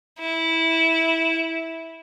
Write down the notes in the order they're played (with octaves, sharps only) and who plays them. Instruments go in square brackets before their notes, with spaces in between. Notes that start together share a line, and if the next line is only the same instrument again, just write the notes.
[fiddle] E4